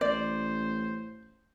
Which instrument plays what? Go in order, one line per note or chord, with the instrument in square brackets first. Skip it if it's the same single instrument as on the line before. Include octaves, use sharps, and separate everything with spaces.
[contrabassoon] A1 [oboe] C5 [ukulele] D5